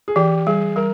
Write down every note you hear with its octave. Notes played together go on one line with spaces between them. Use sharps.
G#4
E3 G4
G3 G#4
G3 A#4